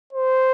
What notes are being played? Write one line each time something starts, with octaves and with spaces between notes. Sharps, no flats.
C5